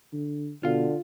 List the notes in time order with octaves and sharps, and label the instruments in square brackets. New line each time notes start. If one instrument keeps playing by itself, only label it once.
[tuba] D3
[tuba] B2 [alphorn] D3 [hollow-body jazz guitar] F4 F5